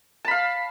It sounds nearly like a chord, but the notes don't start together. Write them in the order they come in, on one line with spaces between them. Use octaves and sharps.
A5 B5 F5